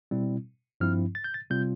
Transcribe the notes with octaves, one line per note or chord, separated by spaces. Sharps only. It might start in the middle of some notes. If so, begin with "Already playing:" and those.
B2 G3 C4 E4
G2 F3 C4 E4 F6
A6
G6
A6
C3 G3 C4 F4 G6